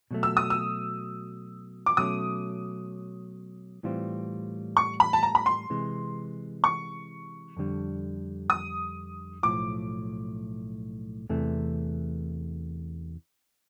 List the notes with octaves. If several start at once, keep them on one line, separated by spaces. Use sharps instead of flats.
B2 F#3 A3
E6
D#6
E6
D6
B2 F#3 A3 C#4 D#6
A2 E3 G3 C4 F4
C#6
B5
A5
A#5
B5
C6
C3 E3 G#3
C#6
F2 D3 G3
D#6
B1 A2 F3 D6
E2 C3 E3 A3